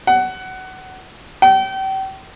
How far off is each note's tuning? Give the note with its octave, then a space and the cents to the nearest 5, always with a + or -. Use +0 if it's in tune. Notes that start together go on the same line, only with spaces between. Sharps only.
F#5 +20
G5 -35